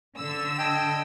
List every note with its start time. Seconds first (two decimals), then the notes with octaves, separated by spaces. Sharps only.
0.18 D3 E6
0.58 D#5 G5 A5 G#6